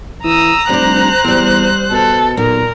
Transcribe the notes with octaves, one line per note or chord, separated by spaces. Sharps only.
E3 A#5 D#6 E6
F1 G3 D4 C5 F#6
E2 G3 C4
B2 A4
B1 A#2 A#4